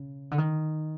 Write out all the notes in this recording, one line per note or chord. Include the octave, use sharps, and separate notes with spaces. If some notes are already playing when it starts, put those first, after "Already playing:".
Already playing: C#3
D3
D#3